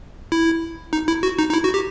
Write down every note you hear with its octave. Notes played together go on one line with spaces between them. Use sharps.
E4
D#4
E4
F#4
D#4
D#4
E4
F#4
G4